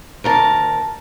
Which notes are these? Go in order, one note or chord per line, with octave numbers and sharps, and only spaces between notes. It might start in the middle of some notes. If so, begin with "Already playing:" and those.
D2 A#4 A5